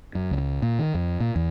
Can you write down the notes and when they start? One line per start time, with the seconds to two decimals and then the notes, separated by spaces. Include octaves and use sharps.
0.15 F#2
0.31 C#2
0.62 A#2
0.79 D#3
0.94 F2
1.20 A#2
1.36 E2